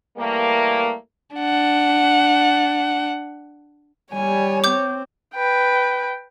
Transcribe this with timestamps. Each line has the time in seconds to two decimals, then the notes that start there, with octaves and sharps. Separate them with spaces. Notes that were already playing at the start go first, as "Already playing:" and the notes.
0.17 E3 G3 A3 A#3
1.36 D4 F#5
4.13 G3 C#5 G#5
4.64 C4 D6 G6
5.35 B4 G5